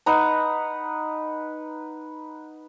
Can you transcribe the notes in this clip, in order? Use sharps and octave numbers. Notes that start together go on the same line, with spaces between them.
D#4 B4 F#5 A#5